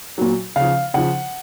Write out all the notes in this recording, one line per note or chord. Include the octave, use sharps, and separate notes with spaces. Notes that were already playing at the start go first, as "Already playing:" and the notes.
A#2 F#3
C#3 F3 F5
C#3 F3 F#5